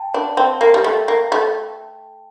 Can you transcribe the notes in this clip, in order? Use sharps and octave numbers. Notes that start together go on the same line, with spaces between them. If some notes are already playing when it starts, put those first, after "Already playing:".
Already playing: G5 A5
D4 A5
C4 G5
A#3
G3
A3
A#3
A3